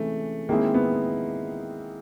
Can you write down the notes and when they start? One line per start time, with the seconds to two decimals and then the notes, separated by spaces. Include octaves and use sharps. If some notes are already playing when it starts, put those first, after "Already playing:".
Already playing: C3 E3 G#3 A3 C#4
0.49 D#3 G#3 A#3 C4 E4 G#4
0.74 B3